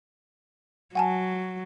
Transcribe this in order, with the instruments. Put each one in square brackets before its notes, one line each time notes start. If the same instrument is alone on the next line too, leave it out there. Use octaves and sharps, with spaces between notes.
[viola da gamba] F#3 [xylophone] F#5 G#5 A5